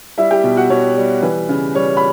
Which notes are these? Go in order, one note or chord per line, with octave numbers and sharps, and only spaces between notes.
G3 E4 E5
G4 G5
B2
F#4 F#5
B2 C#5
G3
E3 B4
C#3
G3 C#5
B5